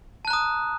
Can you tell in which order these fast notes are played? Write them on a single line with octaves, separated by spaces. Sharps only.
A5 F#6 A#5 D#6